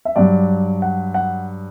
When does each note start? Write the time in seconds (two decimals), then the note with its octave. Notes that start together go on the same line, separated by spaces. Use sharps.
0.05 E5
0.16 G2 F#3 D5
0.82 F#5
1.14 F#5